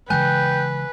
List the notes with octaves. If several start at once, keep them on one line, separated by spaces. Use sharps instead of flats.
C#3 E3 G#3 B4 G5 G#5 F#6